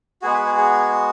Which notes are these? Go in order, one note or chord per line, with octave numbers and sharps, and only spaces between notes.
G#3 B3 F#4 G#4
B4
G#4
G#4